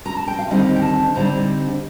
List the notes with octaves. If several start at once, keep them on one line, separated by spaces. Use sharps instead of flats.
A#5
A5
G5
F5
D#2 D3 G3 C4 D#4 D#5
G5
A5
D3 G3 C4 D#4 A#5